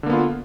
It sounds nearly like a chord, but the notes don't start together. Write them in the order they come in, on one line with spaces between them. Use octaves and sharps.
D3 A#3 B3 F4